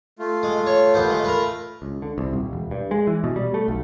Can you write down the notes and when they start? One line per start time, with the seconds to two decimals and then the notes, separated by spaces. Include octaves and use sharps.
0.19 A3 F4
0.43 G#3
0.67 C#5
0.94 D#2 B3 C5
1.08 G#3
1.25 A#4 B4
1.82 C#2
2.02 D3
2.18 C2
2.33 D#1
2.53 E1
2.71 G2
2.91 G#3
3.07 E3
3.24 B2
3.36 G3
3.54 A3
3.68 B1